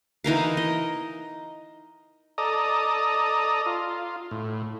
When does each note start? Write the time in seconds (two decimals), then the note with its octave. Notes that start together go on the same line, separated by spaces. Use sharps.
0.24 E3 D#4 A#4 F5
0.57 D#5
2.38 A4 D5 D#5 A#5 D#6
3.66 F4
4.31 A2